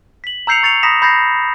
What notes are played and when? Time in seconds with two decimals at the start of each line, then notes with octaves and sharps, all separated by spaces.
0.24 B6 F#7
0.47 A#5 E6 G6 C7 C#7 F7
0.63 C#6 A6 C#7 F7
0.83 A#5 B5 D#6 A#6 B6 E7
1.02 B5 G6 A6 A#6 C7